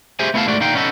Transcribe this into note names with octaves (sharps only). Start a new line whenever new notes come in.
G4 G#4 C5 E5 G#5
A3 B3 E4 G#4 F5 A5
G#2 A3 F#4 D5
A#2 D3 D#4 F5 G5
B3 C#4 D#4 A4